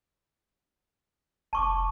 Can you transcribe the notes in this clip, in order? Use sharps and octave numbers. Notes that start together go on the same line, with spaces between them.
F1 A5 C#6 D6